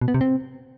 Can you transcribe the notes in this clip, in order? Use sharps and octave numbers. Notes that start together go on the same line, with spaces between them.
B2
B3
C3
C4